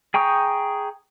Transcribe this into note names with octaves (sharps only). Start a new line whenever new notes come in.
G#4 G5 A#5 C#6 D#6